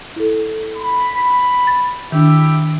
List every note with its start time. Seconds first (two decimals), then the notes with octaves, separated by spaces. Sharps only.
0.16 E4 A4
0.77 B5
1.67 A6
2.12 D#3 D4 E4 G4 E5